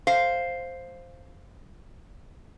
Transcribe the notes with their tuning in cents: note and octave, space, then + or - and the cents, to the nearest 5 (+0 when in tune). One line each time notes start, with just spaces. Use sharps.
C5 +0 F5 +0